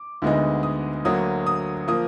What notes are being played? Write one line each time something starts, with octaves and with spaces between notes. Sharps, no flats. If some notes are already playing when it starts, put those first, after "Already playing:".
Already playing: D6
D2 D3 G#3 B3 D#4
D#6
D2 D3 F#3 A#3 D#6
D#6
F3 A#3 D#6